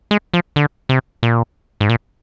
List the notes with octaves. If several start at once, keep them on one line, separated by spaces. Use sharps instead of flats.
G#3
F3
D3
C3
A#2
G#2
A#2